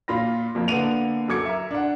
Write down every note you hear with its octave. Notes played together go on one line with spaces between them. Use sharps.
A#2 F4 B5 A#6
F2 A#3
D3 A#3 B3 F#5 D#7 F7
F#2 A4 D6 G#6 C#7
A#4 E5
D4 F#5